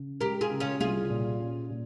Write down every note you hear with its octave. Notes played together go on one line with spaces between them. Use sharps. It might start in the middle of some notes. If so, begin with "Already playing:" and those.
Already playing: C#3
G#3 G4 A#4
F4 G#4
C#3
C#4 F4
C2 F4 G#4
A#2
C#4
A#2